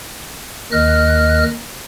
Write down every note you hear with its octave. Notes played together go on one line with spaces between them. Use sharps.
D#2 D#3 D#5 F6 F#6